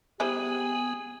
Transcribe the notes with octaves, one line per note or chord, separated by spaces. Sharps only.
G3 B3 E4 G4 G#4 C5 G#5